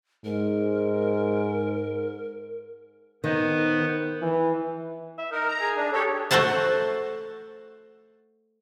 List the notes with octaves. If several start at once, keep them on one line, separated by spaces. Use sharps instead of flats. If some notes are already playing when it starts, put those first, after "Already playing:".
G#2 A#4
D#3 B3 B4 C5
E3
E5
D#4 A#4
A#5
G#4
D4
G4 A4 C#5
A3 F#4 C5 F#5 A5